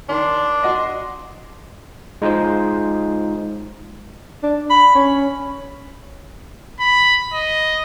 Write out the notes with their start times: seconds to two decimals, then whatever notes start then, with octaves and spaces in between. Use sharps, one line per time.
0.09 D#3 D4 C6
0.63 F#4 D#5 C6
2.22 G#3 D#4 F4 G#4 C5
4.43 D4
4.70 B5
4.95 C#4
6.80 B5
7.33 D#5